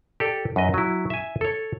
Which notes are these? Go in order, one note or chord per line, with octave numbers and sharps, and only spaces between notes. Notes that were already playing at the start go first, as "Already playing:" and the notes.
G4 A4 D5
F#2 B4 D#5
F#3 E4
E5 G#5
A4 C#5